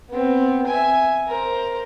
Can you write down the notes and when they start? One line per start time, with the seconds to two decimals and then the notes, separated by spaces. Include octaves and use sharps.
0.10 B3 C4
0.67 E5 G#5
1.28 A#4 C5